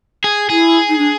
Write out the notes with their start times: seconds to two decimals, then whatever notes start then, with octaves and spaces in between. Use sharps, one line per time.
0.24 G#4
0.49 E4 G#4
0.89 D#4
0.98 D4